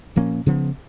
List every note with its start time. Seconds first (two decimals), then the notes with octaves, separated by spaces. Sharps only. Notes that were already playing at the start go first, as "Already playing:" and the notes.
0.16 A#2 F3 A#3 C#4
0.46 C#3 F3 B3